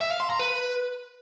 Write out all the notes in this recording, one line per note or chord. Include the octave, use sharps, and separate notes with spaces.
E5
F5
C6
A#5
B4